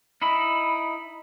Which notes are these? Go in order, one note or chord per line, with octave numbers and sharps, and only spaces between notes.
D#4 E4 B5